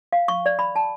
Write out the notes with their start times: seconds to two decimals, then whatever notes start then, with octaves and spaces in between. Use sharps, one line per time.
0.13 F5
0.28 C#6
0.46 D5
0.59 B5
0.76 A5